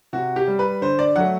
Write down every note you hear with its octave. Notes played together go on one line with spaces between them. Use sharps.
C3 F#4
G4
G3
B4
D3 C5
D5
F#3 A3 F#5